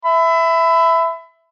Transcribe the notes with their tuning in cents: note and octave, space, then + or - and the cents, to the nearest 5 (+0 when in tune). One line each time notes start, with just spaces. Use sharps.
E5 +0 B5 +30